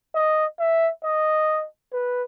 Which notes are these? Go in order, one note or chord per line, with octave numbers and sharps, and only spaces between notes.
D#5
E5
D#5
B4